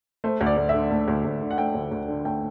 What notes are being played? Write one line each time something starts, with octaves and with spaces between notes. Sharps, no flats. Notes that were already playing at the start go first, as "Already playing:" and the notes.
A3 C5
D2
D5
D2
D3 E5
A3
D2
D2
D3
F#5
A3 G5
D2
D2
D3
A3 G5